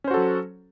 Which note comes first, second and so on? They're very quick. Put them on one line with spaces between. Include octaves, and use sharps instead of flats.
C#4 C5 F#4 A4 F#3